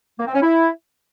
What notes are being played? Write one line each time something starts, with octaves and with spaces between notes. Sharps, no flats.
A#3
C4
C#4
E4